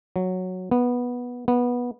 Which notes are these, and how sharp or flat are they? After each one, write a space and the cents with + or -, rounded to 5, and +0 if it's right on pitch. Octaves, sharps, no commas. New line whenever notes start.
F#3 -5
B3 -10
B3 -15